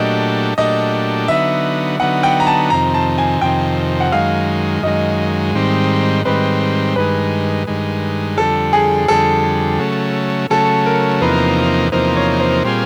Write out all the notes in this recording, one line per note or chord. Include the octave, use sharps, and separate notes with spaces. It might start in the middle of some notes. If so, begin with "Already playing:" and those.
Already playing: A#2 F#3 A3 D4 G4 D#5
A#2 F#3 A3 D4 G4 D#5
D3 F#3 B3 D#4 E5
D3 F#3 B3 D#4 F#5
G5
A#5
A5
F2 C3 D#3 A#5
A5
G#5
F2 C3 D#3 G5
F#5
F#2 D#3 G#3 F5
F#2 D#3 G#3 D#5
G#2 D#3 G3 C4
G#2 D#3 G3 C4 B4
G2 D#3 G#3 B4
G2 D#3 G#3
F2 D3 G3 A4
G#4
F2 D3 G3 A4
C#3 F#3 A3
C#3 F#3 A3 A4
A#4
E2 C3 F3 A#3 D#4 B4
E2 C3 F3 A#3 D#4 C5
C#5
C5
A#2 G3 C4 F4 G#4